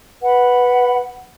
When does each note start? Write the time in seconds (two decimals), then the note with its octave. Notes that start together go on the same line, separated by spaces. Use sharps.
0.21 B4 F#5 B5